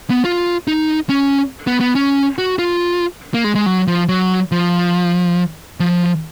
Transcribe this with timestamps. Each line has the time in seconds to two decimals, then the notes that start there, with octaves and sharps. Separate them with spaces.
0.10 B3
0.25 F4
0.67 D#4
1.09 C#4
1.67 B3
1.81 B3
1.95 C#4
2.38 F#4
2.59 F4
3.34 A#3
3.44 G#3
3.55 G#3
3.66 F#3
3.87 F3
4.09 F#3
4.52 F3
5.80 F3